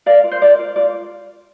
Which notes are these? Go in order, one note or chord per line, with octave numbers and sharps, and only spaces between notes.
A#4 D5 F5
F4
C5
A#4 D5
F4
F4 D5